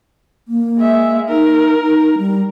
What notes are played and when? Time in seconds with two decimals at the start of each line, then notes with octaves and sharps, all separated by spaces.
0.48 A#3
0.79 G#3 E5
1.29 D#4 A#4
1.82 D#4
2.18 G3